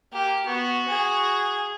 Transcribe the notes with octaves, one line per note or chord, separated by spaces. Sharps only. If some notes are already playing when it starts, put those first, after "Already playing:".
A#3 G4
B3 F#4
G#4